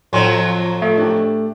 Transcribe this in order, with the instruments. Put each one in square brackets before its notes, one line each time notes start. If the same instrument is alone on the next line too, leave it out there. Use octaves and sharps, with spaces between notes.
[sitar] F2 F3 F#3 [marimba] A2 C#5 [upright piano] G#5 C6
[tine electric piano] A3 [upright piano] E5
[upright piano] D4 G4